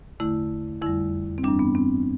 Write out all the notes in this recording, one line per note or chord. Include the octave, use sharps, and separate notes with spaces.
E2 D3 A3 E4
F2 D3 G3 E4
C4
G2 E3 G3 D4
B3
C4